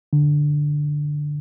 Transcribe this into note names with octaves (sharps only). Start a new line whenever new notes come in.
D3